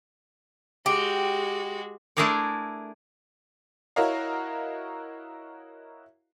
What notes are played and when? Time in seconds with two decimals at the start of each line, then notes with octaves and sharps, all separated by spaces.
0.86 G#3 F#4 G4
2.17 A3 D4 E4 G#4 A#4 D5
3.96 E4 F#4 A#4 C#5 D#5 F5